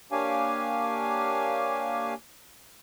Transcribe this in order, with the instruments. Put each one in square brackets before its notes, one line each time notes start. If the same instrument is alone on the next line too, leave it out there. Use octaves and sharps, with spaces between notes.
[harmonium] A#3 D4 G4 C#5 F5 G#5